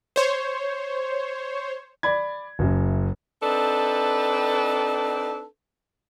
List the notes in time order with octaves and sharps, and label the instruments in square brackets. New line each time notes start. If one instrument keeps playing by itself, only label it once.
[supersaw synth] C5 C#5
[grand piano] D5 B5 G#6
F#1 F#2
[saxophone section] C4 D4 D#4 A4 B4